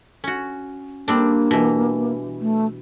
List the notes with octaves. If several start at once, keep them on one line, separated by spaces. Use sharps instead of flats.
C#4 F#4
G3 A#3 C4 D4
B2 E3
A3